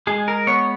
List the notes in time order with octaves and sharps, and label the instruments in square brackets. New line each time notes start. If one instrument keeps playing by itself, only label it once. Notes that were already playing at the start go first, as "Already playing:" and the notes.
[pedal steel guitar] G#3 G#4
A#4
B3 C#5